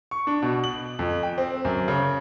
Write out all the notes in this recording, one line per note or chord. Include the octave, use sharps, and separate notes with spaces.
C#6
D4
B2
F#7
F2
G5
C4
F#2
C#3